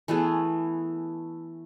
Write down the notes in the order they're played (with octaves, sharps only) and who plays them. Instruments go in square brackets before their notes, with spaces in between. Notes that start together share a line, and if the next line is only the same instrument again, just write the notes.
[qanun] E3 A3 B3 G#4